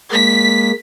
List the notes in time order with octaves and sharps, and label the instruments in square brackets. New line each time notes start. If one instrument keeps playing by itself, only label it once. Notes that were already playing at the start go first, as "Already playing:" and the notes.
[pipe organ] G#3 A#3 [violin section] B6